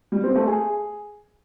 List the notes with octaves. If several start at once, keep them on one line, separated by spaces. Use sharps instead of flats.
G3
C4
A3
G#4